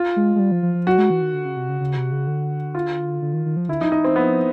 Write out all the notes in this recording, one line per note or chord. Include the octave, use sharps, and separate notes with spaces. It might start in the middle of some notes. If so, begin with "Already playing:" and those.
Already playing: F4
G#3
G#3
G3
F3
F3
F3
F#3 F#4
G#3
E3
D#3
D3
C#3
C3
C#3
C#3
C3
C#3
D3
F4
D3
D#3
D#3
F3
D3 E4
F3 D#4
E3 D#4
C4
F3 B3